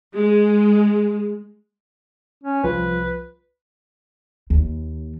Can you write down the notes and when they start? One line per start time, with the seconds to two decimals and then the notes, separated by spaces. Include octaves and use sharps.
0.14 G#3
2.44 C#4
2.64 C2 F3 F4 B4
4.50 D#2